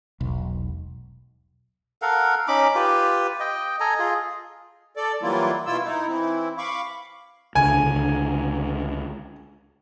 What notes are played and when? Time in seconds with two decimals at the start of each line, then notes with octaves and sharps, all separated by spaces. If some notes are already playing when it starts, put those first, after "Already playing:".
0.21 E1 B1
2.02 A4 A#4 F5 F#5
2.48 C#4 D#4 B5 D6
2.75 F4 G4 B4
3.40 D#5 G5
3.80 A4 D#5 G#5 A#5
3.99 F4 G#4
4.97 A4 D5
5.22 E3 F#3 G3 A#3 E4 F4
5.66 B2 E4 F4 E6
5.84 D#4 E4
6.07 E3 C4 E4
6.58 F5 B5 C#6 D6
7.55 C#2 D3 G#5
7.83 C#2 D3